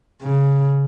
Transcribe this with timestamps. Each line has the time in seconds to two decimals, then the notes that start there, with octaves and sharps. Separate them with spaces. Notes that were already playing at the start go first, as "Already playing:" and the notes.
0.22 C#3